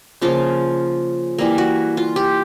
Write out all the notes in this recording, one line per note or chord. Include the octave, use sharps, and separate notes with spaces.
C#3 F3 A#3 F4
E3 G3 A#3
F#4
F4
G4